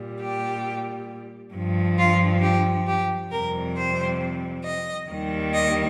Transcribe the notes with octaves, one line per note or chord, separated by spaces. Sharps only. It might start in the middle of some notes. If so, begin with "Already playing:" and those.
Already playing: A#2 G3
G4
G2 F3
F4
G4
G4
F2 C3 G3 A#4
C5
D#5
D#2 D#3 G3
D#5